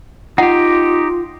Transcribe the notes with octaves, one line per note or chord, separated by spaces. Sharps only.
D#4 F4 G4 F#5